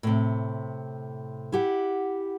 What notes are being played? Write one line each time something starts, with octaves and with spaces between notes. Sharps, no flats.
A2 C3
E4 G4 F#5